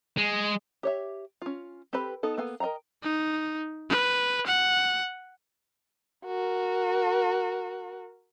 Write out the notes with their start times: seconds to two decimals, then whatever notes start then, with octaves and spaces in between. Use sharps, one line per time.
0.17 G#3
0.83 G4 C#5 E5
1.42 C#4 F4
1.93 C4 G4 A4 B4 B5
2.23 B3 D#4 A4
2.38 A#3 B3 A4 F5 G#5
2.60 A#4 D#5 F5 G5 A#5
3.03 D#4
3.89 B4
4.47 F#5
6.26 F#4 A#4